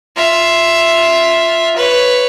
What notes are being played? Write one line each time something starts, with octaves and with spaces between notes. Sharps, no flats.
F4 E5
B4 C#5